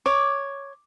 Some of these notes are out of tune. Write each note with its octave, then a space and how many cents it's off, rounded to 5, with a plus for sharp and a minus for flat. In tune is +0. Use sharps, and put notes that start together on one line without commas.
C#5 +0 D6 +0